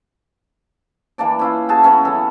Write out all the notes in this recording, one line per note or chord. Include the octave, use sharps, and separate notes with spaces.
E3 A#3 D4 D5
C#4 E4 F4
F#4 G#4 A5
F#3 B3 C#4 E4
E3 A4